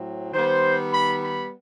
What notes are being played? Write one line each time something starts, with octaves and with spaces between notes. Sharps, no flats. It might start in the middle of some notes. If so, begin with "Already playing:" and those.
Already playing: A2 F#3 C4
D#3 G3 B3 C5
B5
B5